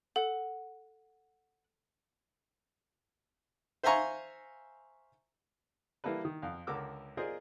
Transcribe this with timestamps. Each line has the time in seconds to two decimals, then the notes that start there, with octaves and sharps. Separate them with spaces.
0.16 A4 F#5
3.83 C5 E5 F5 G#5 A#5 C#6
6.04 E3 G3 A#3 E4 A4 B4
6.25 D#3
6.42 F2 F5
6.67 C#2 D3 A#4 D6 E6
7.17 F4 G#4 A#4 C5 D5 D#5